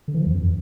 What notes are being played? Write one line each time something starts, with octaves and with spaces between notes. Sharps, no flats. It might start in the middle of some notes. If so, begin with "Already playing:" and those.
D3
E3
F3
E2
F#2